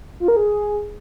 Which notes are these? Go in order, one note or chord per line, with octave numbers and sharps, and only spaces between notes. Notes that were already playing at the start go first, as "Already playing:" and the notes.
F4
A#4
G#4